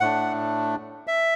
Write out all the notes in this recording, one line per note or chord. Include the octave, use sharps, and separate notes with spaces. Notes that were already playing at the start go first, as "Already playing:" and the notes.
A2 A3 D4 F#5
E5